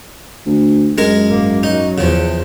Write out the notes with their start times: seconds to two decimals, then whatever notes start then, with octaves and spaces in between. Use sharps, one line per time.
0.46 D2
0.98 F#2 G#3 G#4 A#4
1.27 G#1 A#3
1.63 F#3 D#4
1.98 E2 C#3 F3